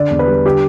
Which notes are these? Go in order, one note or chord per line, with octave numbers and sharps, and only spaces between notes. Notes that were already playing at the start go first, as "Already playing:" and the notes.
Already playing: D3 D5
E2
B4
G3
D3 G4